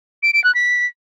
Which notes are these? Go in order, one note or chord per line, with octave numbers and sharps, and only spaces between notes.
D7
D7
F#6
B6